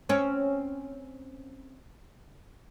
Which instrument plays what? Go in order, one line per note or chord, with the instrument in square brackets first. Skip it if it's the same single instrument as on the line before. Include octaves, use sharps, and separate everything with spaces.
[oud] C4 C#4